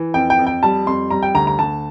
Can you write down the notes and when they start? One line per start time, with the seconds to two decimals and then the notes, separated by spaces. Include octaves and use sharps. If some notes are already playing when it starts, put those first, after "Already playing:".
Already playing: E3
0.14 F2 G5
0.30 G5
0.39 F2
0.47 G5
0.63 G3 A5
0.87 F2 C6
1.10 G3 A#5
1.23 G5
1.35 D2 A#5
1.47 A#5
1.59 D2 A5